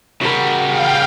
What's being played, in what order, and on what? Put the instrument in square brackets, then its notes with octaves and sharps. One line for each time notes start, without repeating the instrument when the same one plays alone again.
[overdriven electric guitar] C#3 G3 [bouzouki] F#4 A#4
[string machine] F5 G5